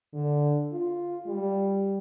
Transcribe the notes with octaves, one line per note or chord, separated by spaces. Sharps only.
D3
F4
G3